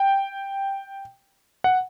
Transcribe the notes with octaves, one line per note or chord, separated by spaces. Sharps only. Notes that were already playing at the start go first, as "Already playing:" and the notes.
Already playing: G5
F#5